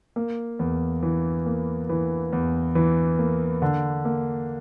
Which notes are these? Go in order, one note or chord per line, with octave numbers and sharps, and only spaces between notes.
A#3
E2
E3
A#3
E3
E2
E3
A#3
D3
A#3